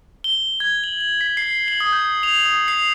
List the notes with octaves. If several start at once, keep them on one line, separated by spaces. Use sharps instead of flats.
G7
G#6
F#7
F#7
B6
C7
F#7
D#6
G6
F7
D#6
C7